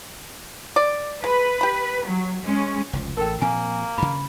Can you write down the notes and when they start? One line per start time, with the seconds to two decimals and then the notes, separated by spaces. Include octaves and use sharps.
0.76 D5
1.24 G#3 B4
1.61 G4 B5
2.06 F#3
2.42 G#3 C#4
2.93 F1 C#2 F3
3.17 A1 A2 A4 A#4 G5
3.42 A#2 F3 A#3 C4 G#5
3.98 G2 C#3 B5